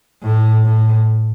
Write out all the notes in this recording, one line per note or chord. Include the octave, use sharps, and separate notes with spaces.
A2
A2